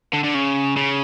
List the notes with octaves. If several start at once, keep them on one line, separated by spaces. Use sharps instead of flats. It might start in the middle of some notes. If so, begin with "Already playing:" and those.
D3
D3
C#3
C#3